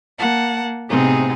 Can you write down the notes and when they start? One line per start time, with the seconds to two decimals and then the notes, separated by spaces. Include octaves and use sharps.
0.19 A#3 F#5 A5
0.88 A2 C3 B3 C4 D#4 G#4